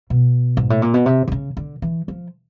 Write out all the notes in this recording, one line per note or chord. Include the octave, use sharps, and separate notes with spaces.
B2
G#2
A2
A#2
B2
C3
D3
C#3
D3
E3
F3